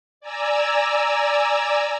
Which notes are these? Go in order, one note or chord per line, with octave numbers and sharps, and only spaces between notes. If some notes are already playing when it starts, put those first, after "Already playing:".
D5 G#5 A#5 E6